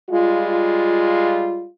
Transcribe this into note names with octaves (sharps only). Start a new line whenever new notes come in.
G3 G#3 F4